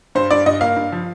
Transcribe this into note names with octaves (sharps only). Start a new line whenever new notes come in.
G2 C5
G2 D5
G2 D#5
A#3 F5
G2
F3